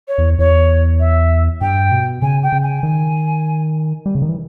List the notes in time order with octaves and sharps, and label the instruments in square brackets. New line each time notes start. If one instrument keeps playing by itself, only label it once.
[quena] C#5
[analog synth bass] E2
[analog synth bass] E2 [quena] C#5
[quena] E5
[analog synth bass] G2 [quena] G5
[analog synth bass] B2
[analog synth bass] C#3 [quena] G#5
[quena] G5
[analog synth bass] C#3
[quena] G#5
[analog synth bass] D#3
G3
C#3
D#3
E3